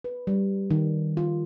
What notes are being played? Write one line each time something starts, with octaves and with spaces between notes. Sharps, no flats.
B4
G3
D#3
F4